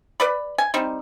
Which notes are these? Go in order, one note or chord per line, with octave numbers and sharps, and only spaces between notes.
B4 D5 B5
G#5
G3 C4 D#4